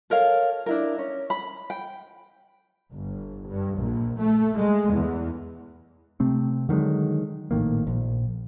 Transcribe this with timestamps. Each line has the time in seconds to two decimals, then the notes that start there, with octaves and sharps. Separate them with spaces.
0.10 A4 A#4 C#5 F5
0.66 D4 E4 A#4
0.99 C#4
1.30 B5
1.70 G5
2.92 G1
3.48 G2
3.77 A#1
4.18 A3
4.55 G#3
4.91 E2
6.20 C3 A3 C4
6.69 D3 D#3 F#3 G#3
7.51 A#1 A2 D#3 A#3
7.87 A#1